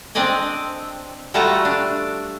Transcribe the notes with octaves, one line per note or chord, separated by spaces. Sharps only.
C4 D4 D5 D#5 G#5
G3 A3 F4 F#4 A5 A#5
D4